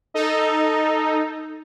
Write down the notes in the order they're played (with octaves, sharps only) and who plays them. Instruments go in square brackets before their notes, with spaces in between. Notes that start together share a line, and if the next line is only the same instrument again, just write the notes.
[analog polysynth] D#4 A4